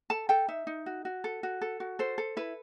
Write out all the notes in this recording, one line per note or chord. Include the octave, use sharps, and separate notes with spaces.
A4 A5
A4 G5
D#4 E5
D#4
F#4
F#4
A4
F#4
A4
F#4
A4 C5
A4
E4 B4